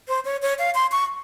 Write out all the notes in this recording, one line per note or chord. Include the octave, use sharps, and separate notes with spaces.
C5
C#5
C#5
F5
C6
C#6